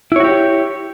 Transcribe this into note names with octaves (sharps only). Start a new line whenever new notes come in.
E4 F#4 G4 C#5